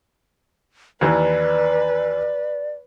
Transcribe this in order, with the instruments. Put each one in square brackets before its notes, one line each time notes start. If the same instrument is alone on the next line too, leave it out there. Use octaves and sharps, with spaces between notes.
[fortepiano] D#2 E3 [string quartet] B4 [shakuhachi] D5